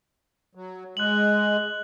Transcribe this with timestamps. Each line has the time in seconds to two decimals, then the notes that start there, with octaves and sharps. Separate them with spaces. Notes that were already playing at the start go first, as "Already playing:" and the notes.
0.55 F#3
0.97 G#3 F#6 F#7